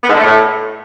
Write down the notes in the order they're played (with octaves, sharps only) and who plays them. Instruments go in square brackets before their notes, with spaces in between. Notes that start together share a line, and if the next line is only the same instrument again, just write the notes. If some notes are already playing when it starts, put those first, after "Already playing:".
[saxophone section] B3
G#2
D3
A3
A2